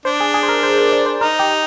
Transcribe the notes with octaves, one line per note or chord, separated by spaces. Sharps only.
D4 C5
G#4
G#4
C5
A#4
C5
D5
D5
C5
D#4 A#4
G4